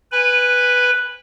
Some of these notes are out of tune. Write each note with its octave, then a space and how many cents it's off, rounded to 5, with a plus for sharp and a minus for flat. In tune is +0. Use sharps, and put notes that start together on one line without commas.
B4 +0 G#5 -25 B5 +0